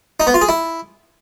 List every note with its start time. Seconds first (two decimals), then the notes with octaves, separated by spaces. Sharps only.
0.20 D#4
0.27 B3
0.34 F4
0.41 G#4
0.49 E4